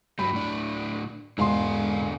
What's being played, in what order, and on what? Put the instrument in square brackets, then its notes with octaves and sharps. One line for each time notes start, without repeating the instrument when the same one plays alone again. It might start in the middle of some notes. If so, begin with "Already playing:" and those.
[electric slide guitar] G2 F#3 G3 [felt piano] B5
[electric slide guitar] A2 D4
[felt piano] E1 G#2 C6 [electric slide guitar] D3 F5